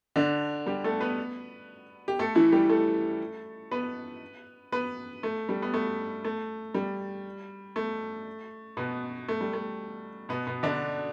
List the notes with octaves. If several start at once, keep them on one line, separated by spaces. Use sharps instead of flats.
D3 D4
G3 G4
A3 A4
B3 B4
G4
A3 A4
E3 E4
G3 G4
A3 A4
B3 B4
B3 B4
A3
G3
B3
A3
A3
G3
A3
B2 B3
A3
G3
A3
B2 B3
B2 B3
D3 D4